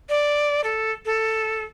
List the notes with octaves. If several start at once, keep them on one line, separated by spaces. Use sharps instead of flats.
D5
A4
A4